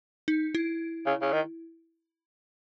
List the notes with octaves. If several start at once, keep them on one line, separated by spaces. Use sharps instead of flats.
D#4
E4
C#3
C#3
D#3